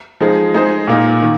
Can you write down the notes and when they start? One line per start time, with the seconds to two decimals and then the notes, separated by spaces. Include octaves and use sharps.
0.20 F3 G#3 D#4 G#4
0.54 G#3 D#4 G#4 C5
0.87 A#2 A#3 D#4
1.22 D#3